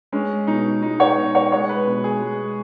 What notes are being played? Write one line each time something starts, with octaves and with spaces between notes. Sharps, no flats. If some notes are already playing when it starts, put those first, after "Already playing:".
G#3 C#4
B2 D#4
G#3 D#4
C#5
B2
C#5
G#3 C#5
B4
B2
G#4
G#3